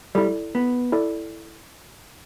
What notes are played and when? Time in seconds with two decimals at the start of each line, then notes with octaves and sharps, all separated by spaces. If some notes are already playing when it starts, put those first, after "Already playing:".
0.15 G3 E4 A4 D5
0.55 B3
0.92 E4 A4 D5